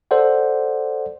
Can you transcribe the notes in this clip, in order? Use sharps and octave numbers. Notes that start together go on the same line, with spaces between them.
A4 C5 D5 F#5